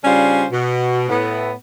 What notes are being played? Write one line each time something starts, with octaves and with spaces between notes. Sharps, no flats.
C#3 G3 C#4 D4 F4 C5
B2
A2 B3